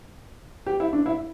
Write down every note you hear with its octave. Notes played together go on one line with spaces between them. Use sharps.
G4
E4
D4
E4